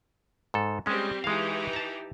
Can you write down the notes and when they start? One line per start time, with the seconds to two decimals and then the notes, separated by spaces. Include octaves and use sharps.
0.54 G#2 A4
0.86 G3 G#3 C4 C#4 G4
1.24 E3 G#3 D#4 G4 F5
1.73 A5 A#5